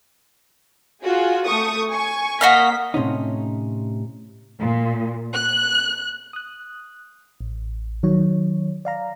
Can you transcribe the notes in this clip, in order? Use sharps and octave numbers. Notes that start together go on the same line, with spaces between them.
F4 F#4 G#4
A3 C#6 D#6
G#5 C#6
A#3 F#4 D#5 F5 B6
A2 C3 C#4 D#4
A#2
F#6
D#6 F#6
A1
D#3 F#3 C#5
D5 F5 A#5